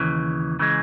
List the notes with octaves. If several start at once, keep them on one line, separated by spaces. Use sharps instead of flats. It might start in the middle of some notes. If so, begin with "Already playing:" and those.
Already playing: D#2 C#3 E3
C#3 E3 G#3